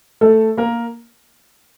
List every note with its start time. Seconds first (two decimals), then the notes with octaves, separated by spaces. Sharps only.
0.21 A3 A4
0.57 A#3 A#4